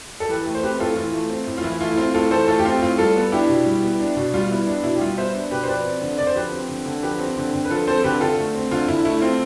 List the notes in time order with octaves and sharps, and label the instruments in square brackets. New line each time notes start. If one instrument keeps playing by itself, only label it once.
[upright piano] A4
E3 G4 B4
A3
C5
C4 G4 B4
A2 F4 A4
E3 F4
A3
C4
A2
F4
E3 E4
A3 F4
E4
C4 F4
A2 F4 A4
E3 A4 C5
A3 F4 A4
G4
C4 F4
A2 F4
G3 F4 A4
B3
D4 E4 G4
B2
G3
B3
D4
B2
G3 F4
B3 E4
D4
B2 E4
G4
G3 F4
B3 C5 E5
D4
B2 G4 B4
C5
F3 B4 D5
C4
D3
D3 D5
C5
F3 G4 B4
C4
D3
D3
F3 G4 B4
C4
D3
D3
B4
F3 F4 A4
C4 A4 C5
D3 G4 B4
D3 F4 A4
A3
C4
D3 F4
D3 E4
A3 E4
C4 F4